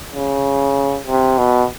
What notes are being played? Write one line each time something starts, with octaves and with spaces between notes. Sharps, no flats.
C#3
C3
B2